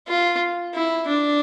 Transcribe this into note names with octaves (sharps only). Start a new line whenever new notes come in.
F4
E4
D4